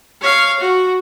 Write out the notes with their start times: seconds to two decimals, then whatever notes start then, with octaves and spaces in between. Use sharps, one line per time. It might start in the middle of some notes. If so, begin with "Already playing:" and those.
0.21 C#5 F5
0.60 F#4